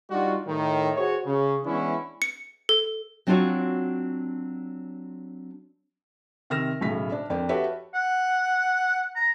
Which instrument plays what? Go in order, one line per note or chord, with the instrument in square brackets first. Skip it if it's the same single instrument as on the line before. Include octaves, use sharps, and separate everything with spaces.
[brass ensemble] G3 D4 D#4 F4 F#4
A2 D#3
F#4 G#4 C5 C#5
C#3
E3 G#3 B3 C#4 D4 E4
[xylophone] C#7
A4
[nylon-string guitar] F#3 C4 D4 F4 F#4 C#5
[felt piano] C3 D#3 F6 A#6 E7
B1 A2 C#3 B6
D4
F2 D4 A#4 G5
F#4 G4 A4 B4 C#5 E5
[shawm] F#5
A#5